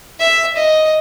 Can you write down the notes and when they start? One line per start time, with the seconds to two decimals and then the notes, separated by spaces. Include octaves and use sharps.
0.20 E5
0.57 D#5